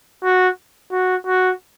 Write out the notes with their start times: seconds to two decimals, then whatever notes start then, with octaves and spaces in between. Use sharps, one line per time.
0.24 F#4
0.92 F#4
1.27 F#4